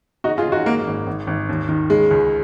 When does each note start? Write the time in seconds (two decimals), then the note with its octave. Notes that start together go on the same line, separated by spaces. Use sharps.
0.24 C#3 D#4 F#4
0.38 F4 G#4
0.45 C#3
0.52 D#4 F#4
0.66 G#2 A#3
0.87 G#1
1.07 G#1
1.27 G#1
1.49 D#2
1.69 D#3
1.90 C#3 G#3
2.11 C#2